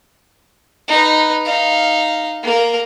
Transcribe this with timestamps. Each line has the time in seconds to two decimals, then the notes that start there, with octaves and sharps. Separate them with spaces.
0.88 D#4 B4
1.45 D#4 F5
2.43 A#3 A#4